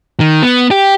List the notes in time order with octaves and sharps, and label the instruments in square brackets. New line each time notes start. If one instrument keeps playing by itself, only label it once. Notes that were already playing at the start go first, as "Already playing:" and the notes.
[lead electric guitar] D#3
B3
G4